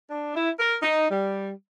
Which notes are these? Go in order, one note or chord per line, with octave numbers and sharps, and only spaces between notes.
D4
E4
A#4
D#4
G3